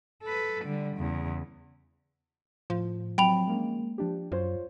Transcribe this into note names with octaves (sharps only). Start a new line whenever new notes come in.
A4 B4
D3 G3
E2 C#3
A2 F3
F#3 C4 G5 B5 F7
G#3 A#3 C#4
F3 D4 G4
F#2 F4 C5 C#5